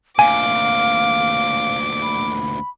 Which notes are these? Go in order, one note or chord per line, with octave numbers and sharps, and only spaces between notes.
D2 A#2 F5 G#5 D6
B5